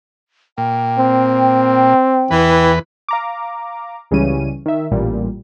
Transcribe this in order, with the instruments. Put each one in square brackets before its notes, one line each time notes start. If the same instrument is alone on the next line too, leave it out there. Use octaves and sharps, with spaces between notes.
[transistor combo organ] A#2 [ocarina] G5
[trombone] C4
[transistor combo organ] E2 B4 [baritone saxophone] E3
[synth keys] F5 A#5 D6
C#2 C#3 E3 G3 C#4 D#7
D#3 E5
A1 A#2 G3